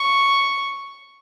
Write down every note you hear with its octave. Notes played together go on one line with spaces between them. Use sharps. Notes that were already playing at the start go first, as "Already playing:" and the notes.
Already playing: C#6